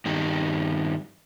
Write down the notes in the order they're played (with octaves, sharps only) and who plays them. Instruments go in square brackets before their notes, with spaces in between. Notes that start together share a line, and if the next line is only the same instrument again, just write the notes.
[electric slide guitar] G2 D#3 G3